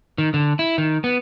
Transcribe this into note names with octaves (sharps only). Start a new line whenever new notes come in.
D#3
D3
E4
D#3
B3